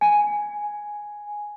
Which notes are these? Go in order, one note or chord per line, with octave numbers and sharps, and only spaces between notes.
G#5